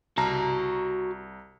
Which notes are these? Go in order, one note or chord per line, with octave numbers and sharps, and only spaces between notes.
C2 F#4 A5 A#5